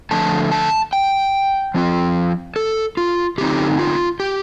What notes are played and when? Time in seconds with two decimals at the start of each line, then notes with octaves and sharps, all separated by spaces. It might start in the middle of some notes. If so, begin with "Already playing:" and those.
0.11 D3 F3 A3 A5
0.52 A5
0.93 G5
1.74 F3 C4 F4
2.56 A4
2.97 F4
3.38 D3 A3 C4 D#4 G4
3.79 F4
4.20 G4